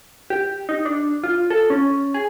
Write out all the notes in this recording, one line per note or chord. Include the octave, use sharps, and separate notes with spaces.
G4
D#4
D4
F4
A4
C#4
G#4